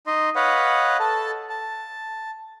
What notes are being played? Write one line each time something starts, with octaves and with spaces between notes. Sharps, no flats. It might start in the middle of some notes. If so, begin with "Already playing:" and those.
D#4 D#5 C6
B4 C#5 D#5 F5 F#5 B5
A4 A5
A5